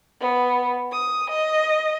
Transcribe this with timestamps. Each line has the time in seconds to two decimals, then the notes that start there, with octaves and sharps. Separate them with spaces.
0.20 B3
0.92 D#6
1.30 D#5